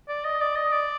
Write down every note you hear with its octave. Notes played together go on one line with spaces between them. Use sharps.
D5
D#5
D5
D#5
D5